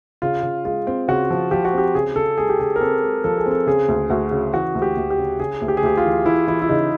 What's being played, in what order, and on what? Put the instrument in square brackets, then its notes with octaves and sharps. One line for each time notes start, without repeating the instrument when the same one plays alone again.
[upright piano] C#3 [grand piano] F4
[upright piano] C#3
[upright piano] G#3 [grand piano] F4
[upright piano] C4
[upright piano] C#3 [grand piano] F#4
[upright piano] F3
[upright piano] F3 [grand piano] G4
[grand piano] F#4
[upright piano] C4 [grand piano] G4
[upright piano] C#3 [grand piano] G#4
[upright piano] C#3 [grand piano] A4
[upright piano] G#3 [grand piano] G#4
[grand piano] G4
[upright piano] C#3 [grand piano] G#4
[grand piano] A#4
[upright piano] C4 [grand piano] A4
[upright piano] G#3
[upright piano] F3 [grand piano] A4
[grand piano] G#4
[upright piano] C4
[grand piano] A4
[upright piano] C#3 [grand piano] G#4
[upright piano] D2
[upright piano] D2 [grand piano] F#4
[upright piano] C#3
[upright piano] E3 [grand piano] F#4
[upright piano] D2
[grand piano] G4
[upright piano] D2
[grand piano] G4
[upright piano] C#3
[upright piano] C#3 [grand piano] G#4
[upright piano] D2
[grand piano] G4
G#4
[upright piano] D2 [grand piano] G4
[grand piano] F4
[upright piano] E3
[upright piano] E3 [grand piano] E4
[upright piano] E3 [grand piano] E4
[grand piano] E4
[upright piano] C#3 [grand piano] D#4